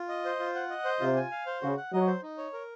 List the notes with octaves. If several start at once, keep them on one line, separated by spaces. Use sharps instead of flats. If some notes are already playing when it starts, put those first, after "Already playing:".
Already playing: F4
D#5
C5
F4
F#5
D#5
C5
C3 F4
G#5
F5
C5
C#3 F#4
F#5
F#3 D#5
C5
D#4
C#5
A#4